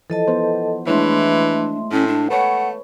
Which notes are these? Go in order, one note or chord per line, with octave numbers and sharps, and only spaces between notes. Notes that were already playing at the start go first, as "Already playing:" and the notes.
E3 F3 A4 D#5 A5
B3 C5
E3 G#3 A3 D4 E4 C#5 E5 C6
A2 C#4
D4
A3 B4 C#5 F#5